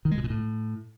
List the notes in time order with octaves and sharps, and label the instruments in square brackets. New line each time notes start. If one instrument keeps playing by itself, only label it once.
[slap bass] D#3
G#3
B2
A#2
A2